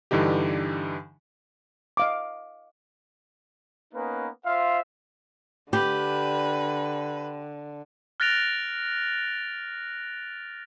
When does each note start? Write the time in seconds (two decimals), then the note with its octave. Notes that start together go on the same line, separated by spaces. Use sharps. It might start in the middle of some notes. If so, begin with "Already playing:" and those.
0.11 G2 D3 E3 D#4 G4
1.97 D#5 F5 D6
3.94 A#3 B3 C#4 D#4 B4
4.45 F4 C5 E5 F5
5.73 D3 G4 B4
8.20 F6 F#6 A6 A#6 D7 F7